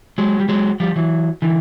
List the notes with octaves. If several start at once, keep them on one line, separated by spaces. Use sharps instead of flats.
F#3 G#3
G3
F#3 G#3
F3 G3
E3 F#3
D3 E3